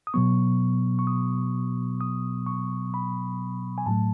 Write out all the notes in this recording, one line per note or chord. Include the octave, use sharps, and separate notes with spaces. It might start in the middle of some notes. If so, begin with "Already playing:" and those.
D#6
B2 F#3 B3 C#6
C#6
D#6
D#6
C#6
B5
G#5
A2 F#3 A3 A5